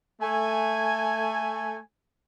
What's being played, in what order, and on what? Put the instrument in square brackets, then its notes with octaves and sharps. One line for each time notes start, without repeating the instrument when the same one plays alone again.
[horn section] A3 G#5